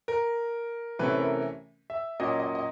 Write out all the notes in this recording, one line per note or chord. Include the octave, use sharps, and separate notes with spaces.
A#4
C3 E3 A3 C#4 B4
A#4
E5
A#2 F#3 A#3 C#4 D#5
D#5
D#5